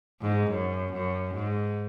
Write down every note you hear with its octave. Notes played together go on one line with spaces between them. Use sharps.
G#2
F#2
F#2
G#2